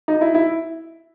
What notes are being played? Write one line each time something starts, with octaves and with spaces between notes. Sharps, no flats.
D#4
E4
E4